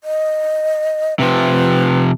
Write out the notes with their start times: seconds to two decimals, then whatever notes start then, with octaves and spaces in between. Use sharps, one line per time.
0.04 D#5
1.19 C3 F3 B4